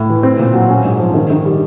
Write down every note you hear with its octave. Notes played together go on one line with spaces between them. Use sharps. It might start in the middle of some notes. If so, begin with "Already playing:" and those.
Already playing: A2
E3
C4
A#2
F#3
C#4
G#2
F3
D#3
D#3
G3